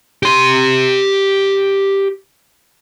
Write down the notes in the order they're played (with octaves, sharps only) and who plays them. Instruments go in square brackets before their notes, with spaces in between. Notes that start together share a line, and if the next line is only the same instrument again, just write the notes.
[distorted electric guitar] G4 C6